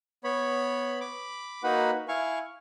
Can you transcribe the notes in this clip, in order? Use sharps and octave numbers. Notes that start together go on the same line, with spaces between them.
B3 C#5 B5
B5 D6
A#3 D#4 F#4 B4 F#5 B5
E4 F5 G#5 C#6